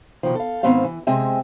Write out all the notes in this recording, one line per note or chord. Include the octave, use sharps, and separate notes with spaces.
B2 D#3 F3
A4 F5
G#2 D#3 B3 C4 C5 F5
E3
C3 G#3 C4 D#5 E5 G#5